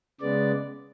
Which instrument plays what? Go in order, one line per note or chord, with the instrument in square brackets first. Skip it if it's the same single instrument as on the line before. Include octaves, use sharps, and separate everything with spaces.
[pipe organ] C#3 G#3 B3 D5